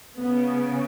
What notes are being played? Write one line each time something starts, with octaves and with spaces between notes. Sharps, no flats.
C#3 B3